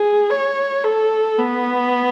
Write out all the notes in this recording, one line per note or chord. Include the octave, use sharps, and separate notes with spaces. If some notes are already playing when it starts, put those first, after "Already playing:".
Already playing: G#4
C#5
A4
B3